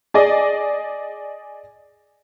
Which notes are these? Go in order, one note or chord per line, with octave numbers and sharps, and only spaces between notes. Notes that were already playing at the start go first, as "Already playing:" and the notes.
G#4 D5 D#5